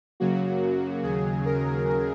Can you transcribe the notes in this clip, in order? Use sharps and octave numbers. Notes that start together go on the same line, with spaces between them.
F#2 C#3 F#3 A#3 F#4
D#2 C#3 F#3 G#4
A#4